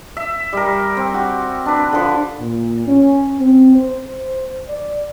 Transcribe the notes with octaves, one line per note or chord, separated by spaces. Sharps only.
E5
G3 A#4
C4
F#4 G4
D4 B4
D3 F3
A#2
C#4
C4
C5
D5